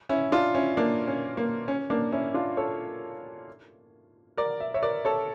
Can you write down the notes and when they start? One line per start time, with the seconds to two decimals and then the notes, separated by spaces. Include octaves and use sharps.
0.09 C#4 E4
0.32 D4 F4
0.55 C#4 E4
0.77 A#3 D4
1.07 C#4
1.37 A#3
1.68 C#4
1.90 A#3 D4
2.12 C#4 E4
2.34 D4 F4
2.57 A4 C#5
4.37 A#4 D5
4.60 E5
4.74 C#5 E5
4.83 A#4 D5
5.05 A4 C#5